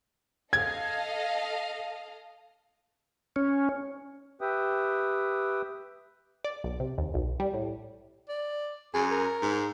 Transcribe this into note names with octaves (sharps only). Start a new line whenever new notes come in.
A4 D#5 F5 G#6
C#4
G4 B4 E5 G5 D#6
D5
B1
C3
D#2
B1
G3
A2
D5
F#2 G#4
A#4
G#2